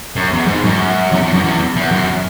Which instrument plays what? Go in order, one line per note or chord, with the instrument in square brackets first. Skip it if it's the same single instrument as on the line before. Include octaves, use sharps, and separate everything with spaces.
[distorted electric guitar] F#2
E2
G#2
F#2
E2
E2
F#2
E2
E2
F#2